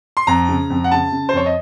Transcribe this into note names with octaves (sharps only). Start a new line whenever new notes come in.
C6
F2 A#5
C#3
F2
F#5
C#3 A5
C#3
C5
F2 C#5
D#5